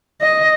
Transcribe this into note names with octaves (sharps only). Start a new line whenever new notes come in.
D#5